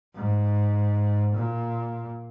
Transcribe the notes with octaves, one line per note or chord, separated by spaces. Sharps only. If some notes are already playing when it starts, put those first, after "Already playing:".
G#2
A#2